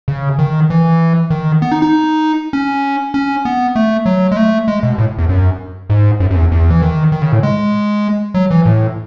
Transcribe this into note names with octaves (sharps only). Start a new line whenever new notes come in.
C#3
D#3
E3
D#3
B3
D#4
D#4
C#4
C#4
B3
A3
F#3
G#3
A3
G#3
B2
A2
E2
F#2
G#2
F#2
F#2
E2
E2
E3
D#3
D#3
C#3
A2
G#3
F#3
E3
A2